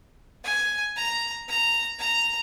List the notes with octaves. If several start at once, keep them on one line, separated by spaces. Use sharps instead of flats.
G#5
A#5
A#5
A#5